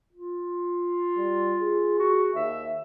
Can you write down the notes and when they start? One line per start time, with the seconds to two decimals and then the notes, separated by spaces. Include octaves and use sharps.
0.13 F4
1.17 G3
1.61 G#4
1.99 F#4
2.35 D#2 E5